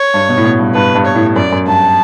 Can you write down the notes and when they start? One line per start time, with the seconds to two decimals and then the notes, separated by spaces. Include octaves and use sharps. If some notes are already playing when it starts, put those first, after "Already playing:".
Already playing: C#5
0.14 G2
0.29 B2
0.37 A2
0.44 B2
0.59 G2
0.74 G2 B4
0.95 G2
1.05 C#5
1.15 A2
1.36 F#2 D5
1.52 F#2
1.67 G2 A5